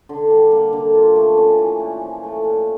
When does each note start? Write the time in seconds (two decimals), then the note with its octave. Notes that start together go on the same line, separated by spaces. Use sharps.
0.09 D3
0.30 G3
0.51 A#3
0.73 D3
0.95 F4
1.16 A3
1.37 C#4
1.59 E3
1.80 A#2
2.01 F3
2.23 A3
2.44 A#2